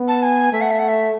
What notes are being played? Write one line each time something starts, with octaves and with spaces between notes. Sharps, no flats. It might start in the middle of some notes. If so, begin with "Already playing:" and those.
Already playing: B3
A5
G#5
A3 E5
F#5
E5
F#5
E5